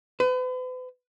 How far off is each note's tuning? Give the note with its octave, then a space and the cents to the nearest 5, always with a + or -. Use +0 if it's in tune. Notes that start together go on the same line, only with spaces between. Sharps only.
B4 +40